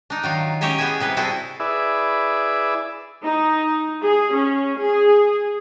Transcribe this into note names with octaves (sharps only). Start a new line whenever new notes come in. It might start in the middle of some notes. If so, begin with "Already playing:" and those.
D4 D#4
D#3 F#3 F4
C#4 G4 C#5 D#5 E5 G#5
B3 E4 G#4 E5 G#5
C3 G3 B4
C3 C4 E4 F#4 G#4 A4
E4 G#4 B4 D5 E5
D#4
G#4
C#4
G#4